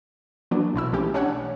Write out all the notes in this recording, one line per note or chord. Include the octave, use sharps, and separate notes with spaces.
E3 F#3 A#3 B3 D4
B1 B2 E4 E6
E3 A3 C#4 G4
C#4 D4 C#5 F#5